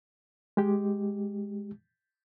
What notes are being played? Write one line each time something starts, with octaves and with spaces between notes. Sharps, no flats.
G#3 G4